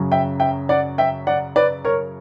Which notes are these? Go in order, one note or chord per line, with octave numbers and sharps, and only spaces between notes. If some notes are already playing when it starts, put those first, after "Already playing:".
Already playing: F#2 C#3 F#3 C#4
E5 G5
E5 G5
D5 F#5
E5 G5
D5 F#5
B4 D5
A#4 C#5